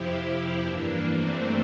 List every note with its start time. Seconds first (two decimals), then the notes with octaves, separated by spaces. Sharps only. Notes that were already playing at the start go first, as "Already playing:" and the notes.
Already playing: F2 C3 F3 E4 G4
0.59 G2 E3 A#3 D4
1.07 A3 C4